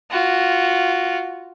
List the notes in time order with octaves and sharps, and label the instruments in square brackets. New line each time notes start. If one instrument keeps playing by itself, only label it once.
[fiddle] F4 F#4